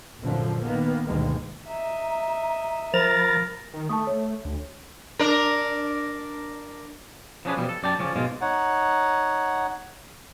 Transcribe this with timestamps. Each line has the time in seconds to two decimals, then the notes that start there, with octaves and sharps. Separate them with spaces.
0.20 A#1 F#2 D3 F3
0.63 D#3 A#3 B3
1.06 D2 G2 B2 D#3 G#3 A#3
1.67 D#5 E5 A#5
2.94 F3 A#4 A#5 B5 A6
3.74 D#3
3.89 A3 A5 C#6 D#6
4.07 C#5
4.45 D2
5.19 D4 A#4
7.45 F3 B3 C#4 D4 G#4 B4
7.57 B2 F3 G3
7.69 A4
7.83 F#2 D5 G5 A5
7.99 C#2 F3 C#4 D5
8.16 G#2 B2 G#3 F4
8.41 D#4 C#5 F#5